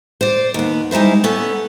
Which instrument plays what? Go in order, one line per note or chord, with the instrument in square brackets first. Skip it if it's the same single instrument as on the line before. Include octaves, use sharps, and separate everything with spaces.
[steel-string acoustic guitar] C5 D5
D#2 B3
G3 G#3 D#4 E4 C5
B3 C#4 A4